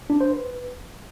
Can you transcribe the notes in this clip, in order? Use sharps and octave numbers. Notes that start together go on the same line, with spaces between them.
D4
C5
B4